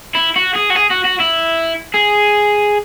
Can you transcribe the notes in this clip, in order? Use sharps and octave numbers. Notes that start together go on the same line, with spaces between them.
E4
F#4
G#4
F#4
G#4
F#4
F#4
E4
G#4